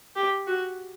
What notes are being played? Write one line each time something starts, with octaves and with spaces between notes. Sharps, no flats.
G4
F#4